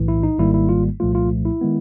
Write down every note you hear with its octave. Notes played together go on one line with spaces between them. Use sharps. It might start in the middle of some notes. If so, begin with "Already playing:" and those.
Already playing: B1 A2 E3
E4
D#4
G#1 G#2 D#3 G3 A#3 E4
E4
F4
C2 A#2 F3 A3 F4
F4
E4
D#3 G#3 B3